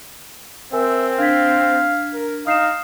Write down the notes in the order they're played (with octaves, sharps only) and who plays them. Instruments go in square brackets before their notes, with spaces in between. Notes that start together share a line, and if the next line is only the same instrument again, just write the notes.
[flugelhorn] C4 [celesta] A#4 G#5 [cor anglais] E5
[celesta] D4 G#6 B6 [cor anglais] F5
[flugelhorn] A#4
[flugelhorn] D#4 [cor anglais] F5 [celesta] D#6 C7 E7